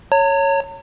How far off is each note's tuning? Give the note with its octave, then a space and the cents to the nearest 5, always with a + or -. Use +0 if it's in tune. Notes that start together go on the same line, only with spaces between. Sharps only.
C#5 +0 A#5 -45